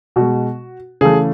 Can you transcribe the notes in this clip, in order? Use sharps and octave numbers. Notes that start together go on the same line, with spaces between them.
B2 G#3 F#4
C#3 E3 A3 G#4